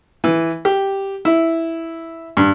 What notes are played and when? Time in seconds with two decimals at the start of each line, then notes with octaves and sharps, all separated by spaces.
0.24 E3
0.65 G4
1.25 E4
2.37 G2